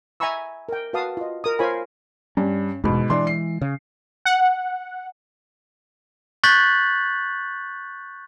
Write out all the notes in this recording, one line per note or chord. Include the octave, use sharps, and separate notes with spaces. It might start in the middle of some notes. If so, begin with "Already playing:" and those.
E5 G#5 A#5 B5 C#6 E6
A#4 G5
F#4 B4 F5 A5 D#6
F4 D#5
A#4 D#6
F4 A#4 C5 C#5 G#5 B5
G2 C#4
E1 D#2 G#2 B2
E3 G#3 D4 C6
C7
C#3
F#5
C#6 F#6 G6 A6 B6 F#7